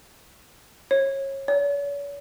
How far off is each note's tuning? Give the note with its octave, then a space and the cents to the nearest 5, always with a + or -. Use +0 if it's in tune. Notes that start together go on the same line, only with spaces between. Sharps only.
C#5 -30
C#5 +45